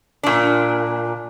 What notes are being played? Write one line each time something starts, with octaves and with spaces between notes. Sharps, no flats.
A#2 D4